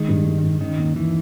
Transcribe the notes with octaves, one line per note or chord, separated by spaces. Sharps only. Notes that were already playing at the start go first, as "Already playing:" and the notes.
Already playing: D#3 G#3
G2
G#3
G2
D#3 C#4
D#2
D#3 E3